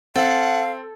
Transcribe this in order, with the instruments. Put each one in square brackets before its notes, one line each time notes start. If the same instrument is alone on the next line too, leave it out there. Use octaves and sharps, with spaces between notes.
[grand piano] C4 [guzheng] A4 [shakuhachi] F5 [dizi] F#5